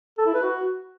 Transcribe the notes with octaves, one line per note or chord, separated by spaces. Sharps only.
A4
E4
B4
F#4